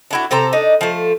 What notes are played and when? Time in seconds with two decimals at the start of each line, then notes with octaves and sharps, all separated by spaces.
0.11 D4 E4 F#4
0.31 C3 A4 C5 A#5
0.53 D4 D#4
0.81 F3 A3